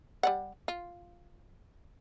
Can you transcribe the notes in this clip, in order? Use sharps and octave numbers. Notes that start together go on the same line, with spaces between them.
G3 D5 F#5
F4